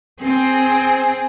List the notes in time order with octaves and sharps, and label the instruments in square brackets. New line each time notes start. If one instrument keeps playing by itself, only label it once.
[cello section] C4 [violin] G#4